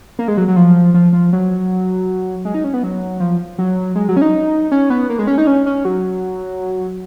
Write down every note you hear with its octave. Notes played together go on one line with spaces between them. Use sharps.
A#3
G#3
F#3
F#3
F3
F3
F3
F#3
G#3
D#4
C#4
B3
F#3
F3
F#3
G#3
F#3
C#4
D#4
C#4
B3
A#3
G#3
C#4
D#4
C#4
C#4
F#3